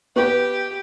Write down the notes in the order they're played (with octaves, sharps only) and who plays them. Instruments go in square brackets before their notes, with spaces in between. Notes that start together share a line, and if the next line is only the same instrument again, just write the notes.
[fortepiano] B3 B4 [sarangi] G4